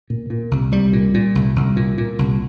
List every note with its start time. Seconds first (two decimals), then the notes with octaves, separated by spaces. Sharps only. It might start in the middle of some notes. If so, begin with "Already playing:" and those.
0.10 A#2
0.30 A#2
0.51 C2
0.72 C2 G3
0.93 A#2
1.14 A#2
1.35 C2
1.56 C2
1.76 A#2
1.98 A#2
2.19 C2